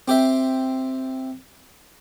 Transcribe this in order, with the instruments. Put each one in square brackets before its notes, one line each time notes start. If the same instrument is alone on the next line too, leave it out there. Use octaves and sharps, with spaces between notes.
[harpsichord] C4 G4 C5 E5